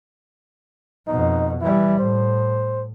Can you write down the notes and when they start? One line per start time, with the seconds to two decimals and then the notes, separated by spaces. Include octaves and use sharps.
1.07 F2 B2 D#4
1.61 E3 G3 E4
1.99 A2 C5